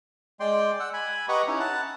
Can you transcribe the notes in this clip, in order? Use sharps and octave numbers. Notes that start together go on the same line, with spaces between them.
G#3 D5 G5 C6
F#5 E6
G#5 B5
G4 B4 D#5 F#5 A#5 C#6
C#4 D#4 E4
F#5 A5